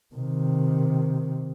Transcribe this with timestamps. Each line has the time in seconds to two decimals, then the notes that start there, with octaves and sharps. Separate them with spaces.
0.15 C3 D#3